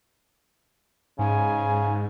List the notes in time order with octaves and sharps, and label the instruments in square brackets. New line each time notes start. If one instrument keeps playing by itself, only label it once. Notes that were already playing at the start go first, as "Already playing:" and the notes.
[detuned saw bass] G#2 [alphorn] C#3 [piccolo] G#5